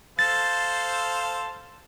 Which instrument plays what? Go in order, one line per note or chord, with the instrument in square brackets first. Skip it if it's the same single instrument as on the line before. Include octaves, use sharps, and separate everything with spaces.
[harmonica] A4 C5 F5 [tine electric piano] A6